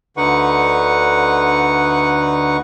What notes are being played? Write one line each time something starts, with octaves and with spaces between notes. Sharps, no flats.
D2 D3 D#4 B4 F#5 C#6